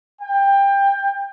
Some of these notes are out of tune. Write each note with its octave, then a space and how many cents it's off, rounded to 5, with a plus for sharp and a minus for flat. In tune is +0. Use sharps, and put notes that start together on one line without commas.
G5 +20